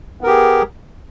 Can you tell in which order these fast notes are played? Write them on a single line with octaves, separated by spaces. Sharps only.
B3 A#4 G4 G#4